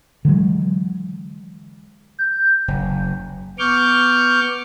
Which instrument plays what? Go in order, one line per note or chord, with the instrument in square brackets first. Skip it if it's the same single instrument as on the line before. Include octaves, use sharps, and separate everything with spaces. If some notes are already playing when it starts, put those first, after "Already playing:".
[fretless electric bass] D3 E3 F#3 G#3
[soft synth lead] G6
[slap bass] F#1
[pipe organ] B3 C#6 D6 F6 G6